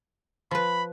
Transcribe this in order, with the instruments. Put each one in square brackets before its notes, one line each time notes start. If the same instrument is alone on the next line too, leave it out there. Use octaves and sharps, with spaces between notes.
[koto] F3 B4 [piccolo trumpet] B5